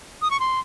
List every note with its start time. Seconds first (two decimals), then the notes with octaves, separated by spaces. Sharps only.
0.22 D#6
0.31 C#6
0.40 C6